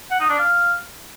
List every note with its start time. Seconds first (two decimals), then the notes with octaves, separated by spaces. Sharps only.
0.11 F#5
0.20 D#4
0.30 D4
0.39 F5